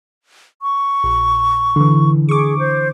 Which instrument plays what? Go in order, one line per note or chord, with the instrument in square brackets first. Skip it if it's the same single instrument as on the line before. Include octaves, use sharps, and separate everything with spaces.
[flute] C#6
[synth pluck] A#1
D3 E3
[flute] G#4 [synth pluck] C#6 D6
[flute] C5